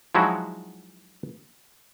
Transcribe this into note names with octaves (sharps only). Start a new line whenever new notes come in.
F3 F#3 G#3 D#4 E4 F#4